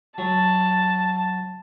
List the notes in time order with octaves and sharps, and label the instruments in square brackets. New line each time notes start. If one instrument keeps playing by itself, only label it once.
[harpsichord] F#3 [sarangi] A5